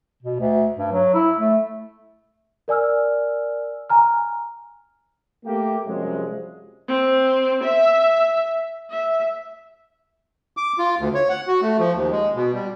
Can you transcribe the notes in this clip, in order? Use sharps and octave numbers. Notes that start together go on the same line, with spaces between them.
B2
D2
G2
F#3
E4
A3
A#4 D5 G#5 E6 F6
G#5 A#5 F6
A3 A#3 G4
F#2 C3 F3 G3 G#3
C4
E5
E5
D6
F4
D2
C#5
F#5
F#4
A3
F3
D#2
G#3
B2
G3